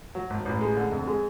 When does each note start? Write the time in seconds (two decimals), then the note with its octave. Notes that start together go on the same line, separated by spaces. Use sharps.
0.15 F#3
0.30 G#1
0.45 A1
0.61 G#3
0.77 D3
0.92 F2
1.07 G#3